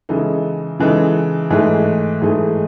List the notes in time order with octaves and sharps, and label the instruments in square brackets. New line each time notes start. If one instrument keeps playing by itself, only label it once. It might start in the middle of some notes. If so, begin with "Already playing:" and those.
[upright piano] C#3 E3 G#3 D#4 A4
C#3 E3 G#3 D#4 A4
G#2 E3 A3 D#4 G#4
G#2 E3 A3 D#4 G#4